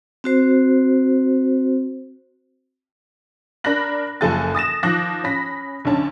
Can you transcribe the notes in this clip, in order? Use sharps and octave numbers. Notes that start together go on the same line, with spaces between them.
C4 F#4 C5
D4 A#4 B5 F#6 A#6 F#7
F#1 F3 A4 G#5 F#6 A6
D#6 A6 A#6 E7
D#3 F3 D6 F#6 A#6
C#4 B5 A#6 B6
B1 D3 C#4 A5